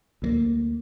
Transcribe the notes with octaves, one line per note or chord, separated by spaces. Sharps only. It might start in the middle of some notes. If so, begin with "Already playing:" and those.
D2 G3 A#3